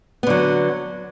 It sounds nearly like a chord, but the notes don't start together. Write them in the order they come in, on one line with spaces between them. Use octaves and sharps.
B3 D3 F#3